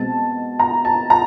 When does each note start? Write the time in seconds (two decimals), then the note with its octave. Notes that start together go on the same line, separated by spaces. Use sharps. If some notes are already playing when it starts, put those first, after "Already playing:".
Already playing: B2 G#3 C4 A5
0.59 A#5
0.85 A5
1.10 A#5